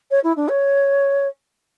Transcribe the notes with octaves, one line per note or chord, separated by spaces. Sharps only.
C#5
E4
D4
C#5